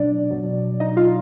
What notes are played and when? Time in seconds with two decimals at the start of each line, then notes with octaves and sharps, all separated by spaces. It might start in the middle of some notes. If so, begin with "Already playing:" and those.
Already playing: B2 F#3 D4 D5
0.31 B2 F#3
0.80 D#4 D#5
0.97 F4 F5